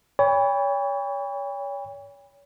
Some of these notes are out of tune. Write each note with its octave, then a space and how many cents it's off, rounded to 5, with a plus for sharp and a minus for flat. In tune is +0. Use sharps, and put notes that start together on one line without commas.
C#5 +35 G5 +40 B5 +0